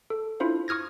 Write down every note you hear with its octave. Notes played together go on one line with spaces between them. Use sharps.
A4
D4 E4 F4 C5 F5
C#6 D#6 F6 G#6 A#6